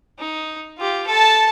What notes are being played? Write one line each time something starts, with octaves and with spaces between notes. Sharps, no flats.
D#4
F4 G4
A4 A5